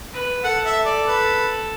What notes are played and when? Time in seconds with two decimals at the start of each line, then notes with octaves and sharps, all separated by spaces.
0.13 B4
0.43 A4 F#5
0.65 E5
0.86 D5
1.07 B4